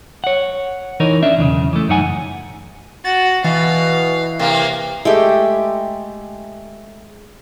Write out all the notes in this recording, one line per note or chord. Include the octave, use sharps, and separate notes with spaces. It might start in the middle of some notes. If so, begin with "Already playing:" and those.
C#5 F#5
E3 D#4 A#4 C#5
C#4 D4 E5
B1 E2 A2 C#3
E3 A3
F#2 F#3 D#4 F#5 G#5
F#4 A6
B2 E3 F5
C3 A#3 F5
G#3 A3 G4